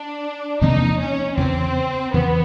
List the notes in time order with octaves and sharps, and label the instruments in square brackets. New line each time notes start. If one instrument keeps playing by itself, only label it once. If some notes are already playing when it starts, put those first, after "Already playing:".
Already playing: [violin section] D4
[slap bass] E2 C3 F3 A#3 [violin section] D#4
[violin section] C#4
[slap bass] E2 C#3 E3 [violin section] C4
[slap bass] E2 C#3 E3 [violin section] B3